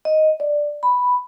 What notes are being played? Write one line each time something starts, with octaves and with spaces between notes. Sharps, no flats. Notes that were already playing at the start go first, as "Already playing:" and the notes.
D#5
D5
B5